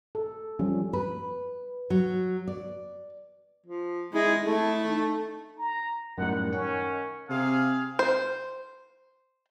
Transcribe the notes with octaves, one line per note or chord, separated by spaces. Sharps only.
A4
F3 G3 C#4
B4
F#3
D5
F3
G#3 E4 G#4
A3 E4 A5
D#4
A#5
F#2 A2 D#3 G3 F#5
C#4 F#5
C3 G#4 F5
C5